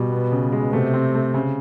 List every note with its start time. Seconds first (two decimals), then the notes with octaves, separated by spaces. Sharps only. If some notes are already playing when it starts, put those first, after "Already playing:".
Already playing: B2 G3
0.12 B3
0.32 C#3
0.52 G#3
0.73 C3 A3
0.94 C4
1.15 A3
1.34 C#3